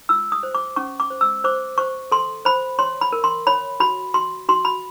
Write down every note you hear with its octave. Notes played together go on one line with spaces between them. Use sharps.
F4 E6
D#6
C5
D6
C#4 C#6
D6
C5
E6
C5 D6
C5 C#6
A4 C6
C5 B5
C#5 C6
B5
A#4
C6
C#5 B5
F#4 B5
F#4 C6
F#4 C6
B5